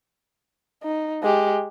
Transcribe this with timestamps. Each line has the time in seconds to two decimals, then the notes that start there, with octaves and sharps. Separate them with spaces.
0.84 D#4
1.23 G#3 G4